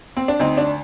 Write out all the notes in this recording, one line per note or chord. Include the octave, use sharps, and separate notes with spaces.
C4
D4
D2 C4 D#4
D4